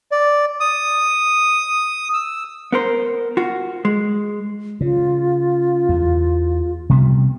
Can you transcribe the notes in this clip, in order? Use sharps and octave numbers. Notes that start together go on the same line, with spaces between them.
D5
D#6
E6
B3 A#4 C5
F4 F#4
G#3
C#3 F4
E2
C3 G3 B3